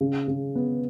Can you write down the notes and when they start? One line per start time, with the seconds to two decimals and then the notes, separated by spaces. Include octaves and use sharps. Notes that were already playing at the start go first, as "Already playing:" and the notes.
0.01 C#3
0.28 C#3
0.55 B3